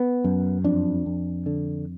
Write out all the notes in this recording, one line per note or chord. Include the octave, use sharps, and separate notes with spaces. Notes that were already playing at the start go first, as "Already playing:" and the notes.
Already playing: B3
F#2
F2 D4
F2
D3